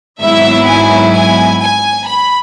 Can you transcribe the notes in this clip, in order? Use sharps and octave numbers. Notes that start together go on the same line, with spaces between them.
G#1 G#2 F#3 B3 E4 E5
G#5
G#5
G#5
B5